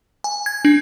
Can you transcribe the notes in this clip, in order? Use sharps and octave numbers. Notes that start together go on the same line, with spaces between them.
G#5
G#6
D4